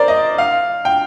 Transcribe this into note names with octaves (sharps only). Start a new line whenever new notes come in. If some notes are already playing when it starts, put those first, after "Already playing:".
Already playing: A#4 C5 D5
D#5
F5
G5